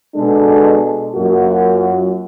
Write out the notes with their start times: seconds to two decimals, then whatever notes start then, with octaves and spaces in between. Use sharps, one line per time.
0.15 B2 G#3 D4 A4
1.14 F#2 A#3 F4 F#4